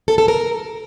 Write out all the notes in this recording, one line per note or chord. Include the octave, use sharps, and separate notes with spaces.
A4
A4
A#4